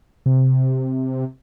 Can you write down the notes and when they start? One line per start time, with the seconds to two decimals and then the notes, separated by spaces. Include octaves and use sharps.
0.26 C3